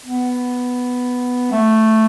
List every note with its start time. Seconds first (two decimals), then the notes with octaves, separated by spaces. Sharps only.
0.06 B3
1.52 A3